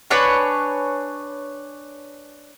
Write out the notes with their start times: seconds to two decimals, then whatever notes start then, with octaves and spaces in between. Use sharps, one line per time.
0.10 D4 B4 C#5 G#5